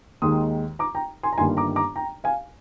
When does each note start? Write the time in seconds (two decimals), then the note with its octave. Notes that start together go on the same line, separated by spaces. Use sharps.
0.22 D#2 D#3 G#3 C6 D#6
0.79 A#5 D6
0.95 G5 A#5
1.23 G#5 C6
1.33 A#5
1.38 G1 G2 D#3 G3 A#3 G#5 C6
1.57 A#5 D6
1.76 A#5 D6
1.96 G5 A#5
2.24 F5 G#5